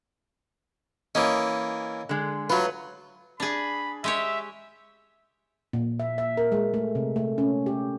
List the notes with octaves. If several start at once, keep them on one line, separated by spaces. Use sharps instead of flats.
E3 A#3 C#4 D#5
D3 G#3
F#3 A3 F4 B4
D4 G#4 B5
G#3 G4 C#5 E5
A#2
E5
E5
A#4
G#3
A3
C3
A3
C#4
G4